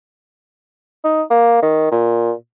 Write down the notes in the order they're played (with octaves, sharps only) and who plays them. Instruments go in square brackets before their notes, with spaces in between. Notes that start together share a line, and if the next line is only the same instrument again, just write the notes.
[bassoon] D#4
A#3
D#3
A#2